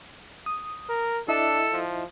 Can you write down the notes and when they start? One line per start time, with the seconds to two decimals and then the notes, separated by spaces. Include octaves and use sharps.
0.46 D#6
0.89 A#4
1.28 D4 E4 A4 D#5 E5
1.73 F3